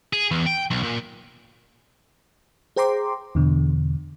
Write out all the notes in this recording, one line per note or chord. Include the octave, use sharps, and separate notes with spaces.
G#4
E2
G5
B1
A#2
G#4 C5 G5 A#5 C6 D6
E2 B2 D3